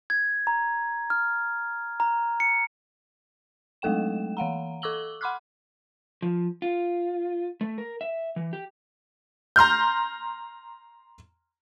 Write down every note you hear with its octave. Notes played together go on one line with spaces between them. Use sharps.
G#6
A#5
F6
A#5
C#7
F#3 G#3 A3 A4 G5 E7
E3 F5 F#5 A#5
A4 C#6 D6 E6 F#7 G7
F#5 B5 C6 D6 F6 F#6
F3
F4
A3
A#4
E5
E3
G4
A#5 C6 F6 G6